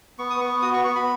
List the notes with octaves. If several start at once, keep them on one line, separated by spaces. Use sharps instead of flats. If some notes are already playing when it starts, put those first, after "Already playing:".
B3 C#6
D#6
B3 C#6
F#4 D#6
C#6
B3 C#6
B5